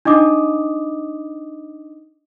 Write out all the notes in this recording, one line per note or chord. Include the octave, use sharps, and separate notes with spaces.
D4 D#4 D#5 D6 D#6